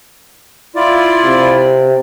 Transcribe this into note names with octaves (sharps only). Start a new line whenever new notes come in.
E4 F4 D5
C3